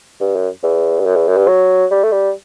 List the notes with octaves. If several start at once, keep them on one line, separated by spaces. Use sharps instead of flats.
G2
F#2
E2
G2
F#2
E2
F#2
G2
F#3
G3
A3
G3